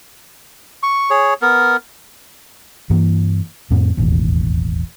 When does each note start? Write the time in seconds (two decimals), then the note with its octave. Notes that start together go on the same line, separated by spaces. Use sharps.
0.83 C#6
1.10 G#4 C#5
1.42 B3 A#4
2.90 G2 E3 A#3
3.70 F2 A2 C4
3.97 E1 A1 D#2